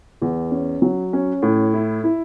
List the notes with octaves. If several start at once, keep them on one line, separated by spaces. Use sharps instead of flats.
E2
C#4
F#3
C#4
A2
E4
E4